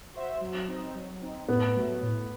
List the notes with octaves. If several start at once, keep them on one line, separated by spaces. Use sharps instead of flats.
F#4 C5 E5
F#3
C4 D#4
F#3
C4 D#4
A2 B3
F#3 A3
A2